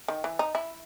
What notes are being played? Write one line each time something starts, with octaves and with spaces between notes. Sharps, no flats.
D#3
E3
D#4
E4